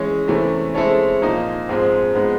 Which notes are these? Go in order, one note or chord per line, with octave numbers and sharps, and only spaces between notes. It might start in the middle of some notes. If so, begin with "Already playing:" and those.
Already playing: E3 G#3 C#4
C3 E3 A3 C#4
G#3 C4 E4 A4 C#5
A#2 F3 A#3 D#4
G#2 F3 G#3 C4
F3 G#3 B3 D#4